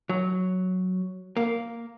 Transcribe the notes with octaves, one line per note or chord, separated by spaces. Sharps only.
F#3
A#3